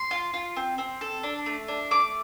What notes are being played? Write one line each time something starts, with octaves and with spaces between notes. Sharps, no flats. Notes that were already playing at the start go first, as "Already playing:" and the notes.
Already playing: C6
F4
F4
C4
C4
A4
D4
A3
D4
A3 D6